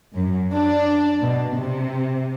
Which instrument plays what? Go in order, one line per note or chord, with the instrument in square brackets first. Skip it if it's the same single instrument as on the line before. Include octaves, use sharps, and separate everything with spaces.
[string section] F#2
D4
B2
C3